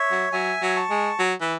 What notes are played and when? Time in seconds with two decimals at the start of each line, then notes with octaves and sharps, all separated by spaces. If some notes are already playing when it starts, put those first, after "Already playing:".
Already playing: C#5 E5
0.11 F#3
0.33 F#3 E5 G#5
0.62 F#3
0.76 A5 C#6
0.90 G#3
1.19 F#3
1.41 E3